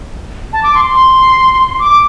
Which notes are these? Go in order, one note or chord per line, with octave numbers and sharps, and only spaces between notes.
A5
D6
C6
C6
D6